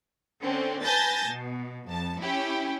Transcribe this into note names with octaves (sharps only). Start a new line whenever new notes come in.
D3 C4 C#4
B4 G#5 A5 G6 A6 A#6
B2
F2 A5
C#4 E4 G4